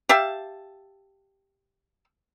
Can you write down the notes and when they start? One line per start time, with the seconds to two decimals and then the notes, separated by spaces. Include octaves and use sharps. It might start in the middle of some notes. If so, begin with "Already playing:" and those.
0.09 G4 E5 F5 A5